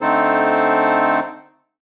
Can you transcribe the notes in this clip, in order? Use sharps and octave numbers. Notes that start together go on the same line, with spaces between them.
D3 A3 C4 D#4 A4 C5